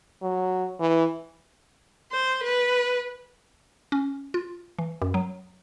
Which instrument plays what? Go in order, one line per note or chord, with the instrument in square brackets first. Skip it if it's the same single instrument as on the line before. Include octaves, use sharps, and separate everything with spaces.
[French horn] F#3
E3
[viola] C5
B4
[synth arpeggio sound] C#4
F4
E3
F#2
F#3